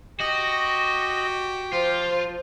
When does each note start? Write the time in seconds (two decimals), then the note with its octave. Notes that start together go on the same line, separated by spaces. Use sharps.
0.20 F#4 G4 D#5
1.73 F3 F4 C5